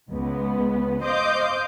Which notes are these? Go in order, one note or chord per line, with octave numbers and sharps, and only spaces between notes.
C#2 B3
C5 D#5 F5 D6 G6